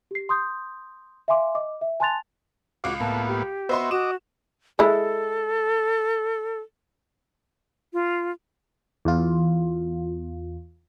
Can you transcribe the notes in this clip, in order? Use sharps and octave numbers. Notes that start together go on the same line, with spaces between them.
G4 C7
C6 D#6 G6
E5 F5 G#5 C6 D6
D#5 D6
E5
G#5 A5 C6 F#6 A6 F7
C#2 F#4 F5 D6
A2 A#3 B3 A5
G4
B3 F#4 C5 D#5 E5 C6
F#4 D#5 D6 E7
G#3 E4 A4
F4
E2 F4